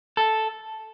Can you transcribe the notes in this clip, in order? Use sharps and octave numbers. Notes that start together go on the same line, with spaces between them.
A4